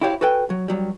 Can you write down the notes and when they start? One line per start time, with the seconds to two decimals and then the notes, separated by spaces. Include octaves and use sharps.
0.01 E4 F#4 G4 C5 C#5 F5
0.21 F#4 A4 B4 D5 G5 G#5
0.50 F#3
0.68 G2 F#3 G3